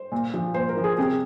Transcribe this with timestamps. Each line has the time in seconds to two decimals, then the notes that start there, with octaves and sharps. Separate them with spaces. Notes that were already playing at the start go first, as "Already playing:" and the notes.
Already playing: C5
0.12 A#2
0.34 F3
0.54 A#2 C5
0.69 A#4
0.77 F3
0.84 G#4
0.98 C3 G#4